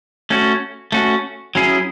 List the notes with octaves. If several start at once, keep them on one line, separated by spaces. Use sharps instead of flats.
A3 C#4 F#4
A3 C#4 F#4
F#3 C#4 E4 G#4